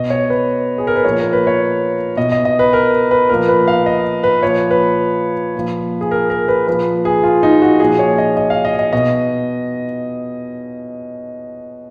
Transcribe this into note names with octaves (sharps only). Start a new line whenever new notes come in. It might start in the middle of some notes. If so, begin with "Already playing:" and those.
Already playing: B2 D#5
C#5
B4
G#4
A#4
B4
A#2 F3 C#5
A#4
B4
C#5
B2 D#5
D#5
D#5
B4
A#4
B4
A#2 F3 A#4
B4
F5
D#5
B4
A#2 F3 C#5
B4
A#2 F3
G#4
A#4
A#4
B4
A#2 F3 B4
G#4
F4
D#4
F#4
A#2 F3 G#4
C#5
D#5
D#5
F5
D#5
D#5
B2 D#5